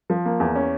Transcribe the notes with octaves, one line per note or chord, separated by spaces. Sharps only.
F3
A#3
E2
C#4